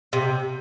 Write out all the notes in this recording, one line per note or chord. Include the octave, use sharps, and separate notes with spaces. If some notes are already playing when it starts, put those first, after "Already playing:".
C3